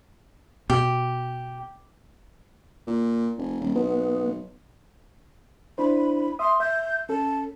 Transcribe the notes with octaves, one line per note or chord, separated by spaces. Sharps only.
B2 G4
A#2
F1
D#1
B1 B3
D4 E4 C5 B5
E5 C6 D#6
E5 G6
C#4 A4 A5